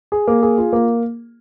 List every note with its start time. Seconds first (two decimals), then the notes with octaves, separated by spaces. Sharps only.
0.12 G#4
0.28 A#3
0.43 G#4
0.58 F4
0.73 A#3